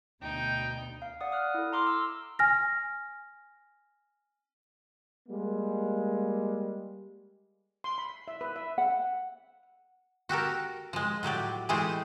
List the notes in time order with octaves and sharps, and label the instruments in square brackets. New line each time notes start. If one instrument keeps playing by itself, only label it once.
[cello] D2 B2 [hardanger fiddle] D#4 [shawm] G5
[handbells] F5
D5 F#5 D#6
D#6 F6 F#6
E4 A4
A#5 C6 D6 F6
E6
[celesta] G#5 F6 A#6
[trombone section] G3 G#3 A#3
[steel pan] C6
B5
E5
B4
E5
[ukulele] F#5
[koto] F#4 G4 A4 A#4
F3 G#3
A2 F#3 G4 D5
E3 G#3 A3 G4 G#4 C5